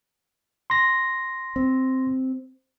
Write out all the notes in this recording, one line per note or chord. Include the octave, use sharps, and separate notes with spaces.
C6 A#6
C4